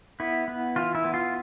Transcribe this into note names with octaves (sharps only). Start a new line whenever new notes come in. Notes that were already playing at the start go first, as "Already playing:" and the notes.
B3 E4
B3
E3 F4
E4
B3
F4